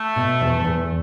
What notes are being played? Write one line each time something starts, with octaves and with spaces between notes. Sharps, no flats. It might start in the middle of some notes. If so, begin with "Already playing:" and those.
Already playing: A3
B2
E2
E2